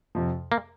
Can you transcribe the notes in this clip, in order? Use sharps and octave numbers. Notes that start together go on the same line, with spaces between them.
F2 C3 F3
A#3